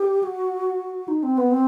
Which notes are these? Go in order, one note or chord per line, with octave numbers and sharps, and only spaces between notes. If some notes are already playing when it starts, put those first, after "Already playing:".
Already playing: G4
F#4
D#4
C4
B3
C4